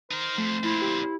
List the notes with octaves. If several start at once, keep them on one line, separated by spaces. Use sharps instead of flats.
D#4 A#4 C5
F2 A3
F2 A#2 E4
G4